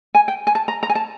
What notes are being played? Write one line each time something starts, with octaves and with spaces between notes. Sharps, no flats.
G#5
G5
G#5
A5
A#5
A#5
G#5
A5